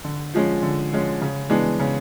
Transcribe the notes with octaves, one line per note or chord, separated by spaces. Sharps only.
D3
F3 G#3 C#4
D3
F3 G#3 C#4
C#3
E3 G#3 B3 D4
C#3